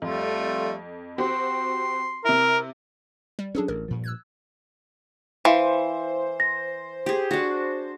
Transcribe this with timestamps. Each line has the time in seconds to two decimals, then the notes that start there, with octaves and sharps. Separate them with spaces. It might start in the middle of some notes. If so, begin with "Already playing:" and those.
0.02 F2 G3 A3 F4
1.18 C4 F#4 G4 C6
2.24 C3 E4 A#4
3.39 G3
3.55 F#3 C#4 D4 G#4 A4
3.68 A1 A#4
3.88 G2 A#2 F3
4.04 E6 F#6 G#6
5.45 E3 E4 C5 F5
6.40 A#6
7.06 G4 G#4
7.31 D4 F#4